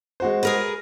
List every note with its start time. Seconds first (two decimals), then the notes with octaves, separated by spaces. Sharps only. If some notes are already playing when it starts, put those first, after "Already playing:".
0.20 G#3 F#4 C5
0.43 G#4 A#4 B4